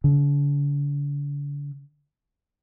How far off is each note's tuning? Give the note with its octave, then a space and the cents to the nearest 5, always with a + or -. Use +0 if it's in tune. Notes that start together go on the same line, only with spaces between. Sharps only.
D3 -45